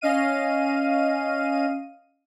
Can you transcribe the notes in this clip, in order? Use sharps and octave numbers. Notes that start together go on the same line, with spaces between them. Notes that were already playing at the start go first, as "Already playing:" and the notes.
C#4 D#5 F5 D#7